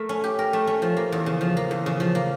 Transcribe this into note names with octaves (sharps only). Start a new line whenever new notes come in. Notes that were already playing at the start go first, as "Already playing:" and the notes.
Already playing: A3 A#4
C#4
G4
A#4
A3
C#4
F3
A#3
E2
C#3
F3
A#3
E2
C#3
F3
A#3